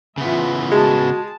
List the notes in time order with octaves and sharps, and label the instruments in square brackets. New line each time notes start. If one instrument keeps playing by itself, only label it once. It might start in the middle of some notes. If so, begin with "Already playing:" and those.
[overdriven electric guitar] C#3 B3 [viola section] E3 F4 E5
[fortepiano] G#3 [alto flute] F#4 [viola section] G#4 A5